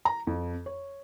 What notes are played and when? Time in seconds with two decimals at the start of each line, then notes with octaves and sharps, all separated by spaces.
0.05 A#5
0.27 F2
0.66 C#5